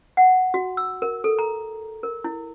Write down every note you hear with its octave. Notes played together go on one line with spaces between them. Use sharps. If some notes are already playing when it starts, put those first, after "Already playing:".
F#5
F#4
E6
A#4
A4
A#5
A#4
E4